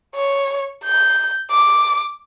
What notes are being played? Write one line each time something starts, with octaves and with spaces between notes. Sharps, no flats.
C#5
G6
D6